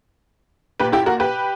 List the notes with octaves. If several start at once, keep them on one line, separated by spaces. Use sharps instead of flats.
A#2 G4 B4
E4 G4
F#4 A#4
G4 B4